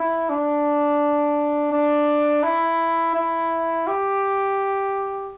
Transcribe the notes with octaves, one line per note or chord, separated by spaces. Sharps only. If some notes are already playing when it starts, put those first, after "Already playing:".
Already playing: E4
D4
D4
E4
E4
G4